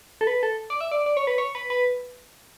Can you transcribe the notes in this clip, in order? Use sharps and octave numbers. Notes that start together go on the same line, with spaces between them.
A4
B4
A4
D5
E5
D5
D5
C#5
B4
C#5
B4
B4